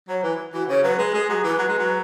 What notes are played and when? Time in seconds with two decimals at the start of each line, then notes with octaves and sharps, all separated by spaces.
0.08 F#3 C#5
0.23 E3 B4
0.53 E3 F#4
0.69 C#3 C#5
0.83 F#3 B4
0.98 G#3 B4
1.14 G#3 G#4
1.29 F#3 G#4
1.44 E3 B4
1.58 F#3
1.68 G#3
1.78 F#3